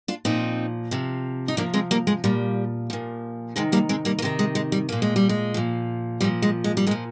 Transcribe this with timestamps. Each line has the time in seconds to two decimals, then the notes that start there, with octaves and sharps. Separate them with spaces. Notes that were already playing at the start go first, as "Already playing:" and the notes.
0.08 D4 F4
0.25 A#2 F3 C4 D#4
0.91 C3 F3
1.48 D#4
1.57 C3 F3 A#3 D4
1.74 G#3 C4
1.91 G3 A#3
2.07 G#3
2.24 A#2 F3 G3
2.90 A#2 F3
3.56 C3 D#3 G#3
3.72 G3 A#3
3.89 G#3 C4
4.05 G3 A#3
4.19 A#3
4.22 C3 D#3 G#3
4.39 G#3
4.55 G#3
4.72 G3
4.89 A#2 F3 A#3
5.02 G#3
5.16 G3
5.29 G#3
5.54 A#2 F3
6.21 A#2 F3 G3
6.42 G#3
6.64 G#3
6.77 G3
6.87 A#2 G#3
6.91 F3